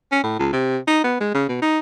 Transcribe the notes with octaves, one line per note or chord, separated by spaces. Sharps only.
C#4
A2
C#2
C3
D#4
B3
G#3
C#3
B2
D#4